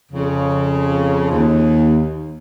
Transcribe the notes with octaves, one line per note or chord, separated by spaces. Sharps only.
F2 C#3
D#2